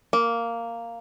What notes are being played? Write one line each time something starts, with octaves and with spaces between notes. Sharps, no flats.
A#3